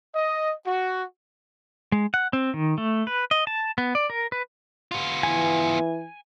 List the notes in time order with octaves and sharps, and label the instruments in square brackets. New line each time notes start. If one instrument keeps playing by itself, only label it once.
[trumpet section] D#5
F#4
[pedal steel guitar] G#3
F#5
C4
D#3
A3
B4
D#5
A5
B3
D5
A#4
B4
[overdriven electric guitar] B3 F4
[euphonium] E3 [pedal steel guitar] G#5